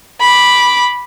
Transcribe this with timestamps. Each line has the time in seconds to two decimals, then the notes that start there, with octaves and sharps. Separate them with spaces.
0.21 B5 D6